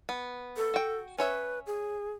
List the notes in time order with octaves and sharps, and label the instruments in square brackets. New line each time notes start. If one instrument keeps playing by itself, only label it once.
[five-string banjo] B3
[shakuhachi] A4
[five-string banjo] F#4 G5
[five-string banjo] C#4 C#5 E5 [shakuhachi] B4
[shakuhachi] G#4